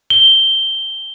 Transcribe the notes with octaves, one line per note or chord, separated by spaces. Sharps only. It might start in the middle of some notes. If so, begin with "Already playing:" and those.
G7